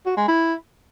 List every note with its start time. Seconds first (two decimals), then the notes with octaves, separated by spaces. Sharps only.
0.06 F#4
0.17 G#3
0.28 E4